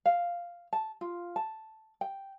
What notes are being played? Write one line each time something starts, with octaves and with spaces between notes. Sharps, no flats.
F5
A5
F4
A5
G5